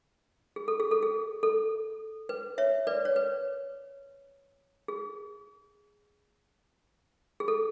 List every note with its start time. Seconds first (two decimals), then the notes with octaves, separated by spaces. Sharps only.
0.56 G#4
0.68 A4
0.80 G#4
0.91 A4
1.03 G#4
1.43 A4
2.29 B4
2.58 C#5 E5
2.87 B4 D5
3.05 C#5
3.16 B4
4.88 G#4
7.40 G#4
7.48 A4